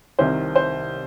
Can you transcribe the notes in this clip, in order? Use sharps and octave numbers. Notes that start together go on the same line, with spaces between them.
C2 C3 D#3 C5
C5